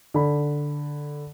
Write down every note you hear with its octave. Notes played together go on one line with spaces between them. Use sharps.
D3 B5